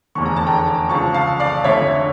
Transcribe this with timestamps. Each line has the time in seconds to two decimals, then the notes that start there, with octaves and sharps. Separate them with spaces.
0.15 F1 E2 D3 C#6
0.26 A#5
0.36 A5
0.47 G5 A#5
0.89 C#2 C#3 F3 A5 C#6
1.14 F5 A5
1.40 D5 F5
1.64 F1 F2 D3 C#5 E5